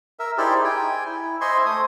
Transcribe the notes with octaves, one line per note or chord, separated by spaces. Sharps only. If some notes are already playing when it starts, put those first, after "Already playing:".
A#4 E5
D#4 E4 G4 G#4 C5 D5
G5 G#5
E4
C5 D#5 E5 G#5 C6 C#6
A3 C5 D#6